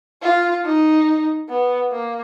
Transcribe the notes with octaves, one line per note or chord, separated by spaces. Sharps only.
F4
D#4
B3
A#3